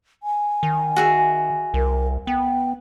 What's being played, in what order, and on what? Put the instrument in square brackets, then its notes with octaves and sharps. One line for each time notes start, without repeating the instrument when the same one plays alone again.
[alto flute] G#5
[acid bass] D#3
[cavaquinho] F#4 G#4 E5
[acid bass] C2 [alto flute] A#4
[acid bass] B3 [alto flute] G5